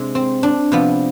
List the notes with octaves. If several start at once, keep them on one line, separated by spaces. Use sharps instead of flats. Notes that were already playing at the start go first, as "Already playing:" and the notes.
Already playing: C3 G#3 D4
C4
D4
C3 F3 B3